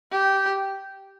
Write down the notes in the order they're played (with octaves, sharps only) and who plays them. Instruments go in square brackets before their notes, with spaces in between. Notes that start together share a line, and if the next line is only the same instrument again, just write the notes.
[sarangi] G4